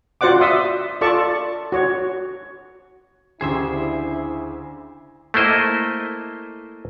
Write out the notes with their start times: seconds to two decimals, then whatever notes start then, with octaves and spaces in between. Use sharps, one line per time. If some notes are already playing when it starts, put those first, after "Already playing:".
0.21 F4 F#4 C5 D5 F#5 D6
0.41 E5 C6 D#6
1.01 F4 A4 D5 A5 C#6
1.72 F#4 C#5
3.41 D2 C#3 E4 G4 G#4 C5 E5
5.34 A3 A#3 E4 C5 D#5